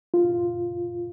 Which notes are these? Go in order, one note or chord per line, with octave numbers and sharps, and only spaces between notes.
F4